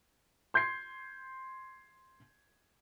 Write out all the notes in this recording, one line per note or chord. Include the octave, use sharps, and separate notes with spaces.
C6 G6 G#6 C7